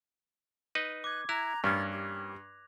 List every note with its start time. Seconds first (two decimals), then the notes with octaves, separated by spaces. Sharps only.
0.75 D#4 B4 D#5
1.04 D6 F#6 G#6
1.29 E4 A#5 F#6 A#6 F7
1.64 G2 E3 A#3 C#4 A6
1.92 G4